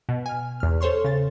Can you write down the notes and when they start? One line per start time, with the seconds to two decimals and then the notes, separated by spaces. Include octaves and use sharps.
0.09 B2
0.26 G#5 F6
0.60 E2 F6
0.81 A4 C5 C#5 C6 C#6
1.04 C#3 A6